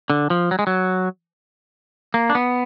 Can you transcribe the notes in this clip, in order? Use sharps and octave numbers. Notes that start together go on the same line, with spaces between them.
D3
F3
F#3
G#3
F#3
A#3
D4
B3